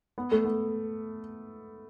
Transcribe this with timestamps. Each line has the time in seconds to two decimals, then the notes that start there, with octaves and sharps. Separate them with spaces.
0.18 B3
0.32 A3
0.45 B3